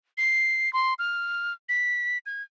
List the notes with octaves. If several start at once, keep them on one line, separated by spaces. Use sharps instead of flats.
C7
C6
F6
B6
G#6